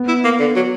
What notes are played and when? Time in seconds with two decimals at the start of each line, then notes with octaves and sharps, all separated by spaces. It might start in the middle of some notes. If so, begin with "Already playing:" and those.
Already playing: B3
0.08 E4
0.24 A#3
0.40 D3
0.56 F#3